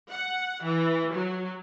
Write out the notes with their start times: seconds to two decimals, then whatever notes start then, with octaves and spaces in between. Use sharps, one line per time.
0.11 F#5
0.62 E3
1.13 F#3